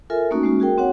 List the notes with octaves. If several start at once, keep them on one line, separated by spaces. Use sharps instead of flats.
F4 A4 A#4 E5 G#5
A3 A#3 C#4 D#4 F#4
G#3 A#3 C#4 F#4
F#4 G#4 A#4 G5
C4 F#4 C#5 F#5